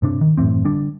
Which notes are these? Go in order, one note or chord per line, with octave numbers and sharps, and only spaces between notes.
G2 C3 D4
D#3
F#2 A2 E3 C4
D3 G3 D4